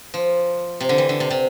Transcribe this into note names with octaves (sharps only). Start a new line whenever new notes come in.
F3
C3
D3
E3
D3
C3
C3